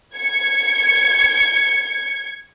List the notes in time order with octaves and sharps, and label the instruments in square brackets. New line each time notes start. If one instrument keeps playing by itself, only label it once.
[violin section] G#6 C#7